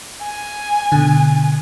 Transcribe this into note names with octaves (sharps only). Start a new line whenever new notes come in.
G#5
B2 D3